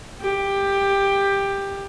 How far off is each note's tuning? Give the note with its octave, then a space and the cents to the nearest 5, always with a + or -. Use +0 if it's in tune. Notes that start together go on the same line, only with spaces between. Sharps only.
G4 +15